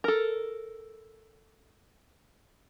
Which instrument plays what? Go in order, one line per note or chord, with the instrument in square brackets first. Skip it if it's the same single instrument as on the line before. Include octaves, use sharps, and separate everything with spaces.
[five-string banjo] A4 A#4